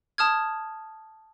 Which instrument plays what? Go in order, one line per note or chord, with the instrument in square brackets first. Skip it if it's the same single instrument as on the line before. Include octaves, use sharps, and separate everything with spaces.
[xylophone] A5 D#6 F6 G#6